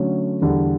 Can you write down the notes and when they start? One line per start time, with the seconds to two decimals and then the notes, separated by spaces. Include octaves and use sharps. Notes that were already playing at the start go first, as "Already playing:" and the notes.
Already playing: D3 F#3 A3 C#4
0.41 E2 D3 G3